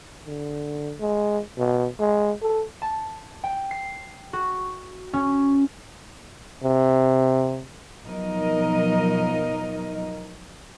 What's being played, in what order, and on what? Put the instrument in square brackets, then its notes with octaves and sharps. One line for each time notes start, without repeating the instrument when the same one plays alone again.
[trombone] D3
G#3
B2
G#3
A4
[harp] A5
G5
C7
F#4
C#4
[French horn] C3
[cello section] B2 F3 F#3 D#4 A#4 D#5